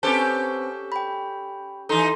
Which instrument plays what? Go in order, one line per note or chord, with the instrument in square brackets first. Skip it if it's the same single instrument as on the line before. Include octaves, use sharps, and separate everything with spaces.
[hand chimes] C4 B4 C5 [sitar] C#4 G4 A4
[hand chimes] G5 B5
[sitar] E3 D#4 [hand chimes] A4 A#5 C6